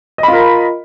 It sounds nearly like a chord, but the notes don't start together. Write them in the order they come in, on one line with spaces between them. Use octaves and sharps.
D#5 B5 F4 A#4